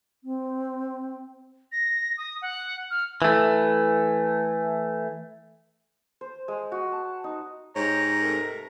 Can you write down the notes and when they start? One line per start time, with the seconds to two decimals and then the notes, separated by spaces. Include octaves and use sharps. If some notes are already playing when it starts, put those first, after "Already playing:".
0.24 C4
1.72 A#6
2.17 D#6
2.42 F#5
2.91 F6
3.22 E3 A3
6.21 C5
6.48 G#3
6.72 F#4
6.92 A5
7.24 D#4
7.76 G#2 G4 A#4 C#5 A#5
8.22 C3 A3 A#4